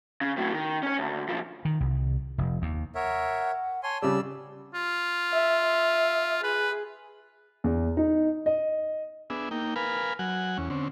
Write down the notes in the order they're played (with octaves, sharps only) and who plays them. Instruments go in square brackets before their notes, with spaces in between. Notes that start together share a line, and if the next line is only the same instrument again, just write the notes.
[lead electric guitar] C#3
A2 F#3
D#3
C#4 C#5
D2
B1 F3
[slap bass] D#3
C2
F1
D#2
[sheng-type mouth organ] A#4 C#5 E5 [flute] F#5
[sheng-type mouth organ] C#5 G#5 C6 [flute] A5
[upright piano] C#3 G3 [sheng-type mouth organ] D5 E6
[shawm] F4
[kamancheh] E5
E5
[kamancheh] G#4 [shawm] B4
[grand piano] E2
D#4
D#5
[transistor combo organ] B3 D4 G#4 E5
A#3 D#4 G5
A#4 B4 F5 G#5 B5
F#3 F#5 G#5
E2 C#4
D3 C4 C#4